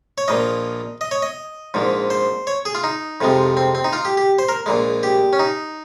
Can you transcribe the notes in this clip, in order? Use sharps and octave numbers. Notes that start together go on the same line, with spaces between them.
C#5
A#1 A#2 F3 D#5
D#5
C#5
D#5
A#1 G#2 F3
C5
C#5
G#4
F4
D#4
F2 C3 F3 G#3
C4
C4
D#4
F4
G4
G4
C5
A#4
A#1 A#2 G#3
G4
C#4
D#4